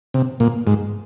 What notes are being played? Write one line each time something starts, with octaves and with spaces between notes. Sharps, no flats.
C3
A#2
G#2